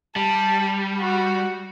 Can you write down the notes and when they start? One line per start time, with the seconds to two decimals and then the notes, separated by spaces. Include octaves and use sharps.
0.16 G3 A5
1.00 F#4